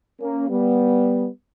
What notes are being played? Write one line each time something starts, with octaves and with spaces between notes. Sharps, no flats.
A#3 C#4
G3 B3